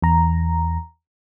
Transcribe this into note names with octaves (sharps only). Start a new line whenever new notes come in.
E2 A#5